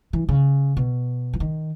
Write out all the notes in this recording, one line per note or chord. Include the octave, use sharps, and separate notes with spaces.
E3
C#3
B2
E3
D#3